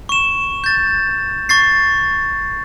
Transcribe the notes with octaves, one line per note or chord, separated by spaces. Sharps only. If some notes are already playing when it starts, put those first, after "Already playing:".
C#6 E7
G6 A6
C#6 A6 C7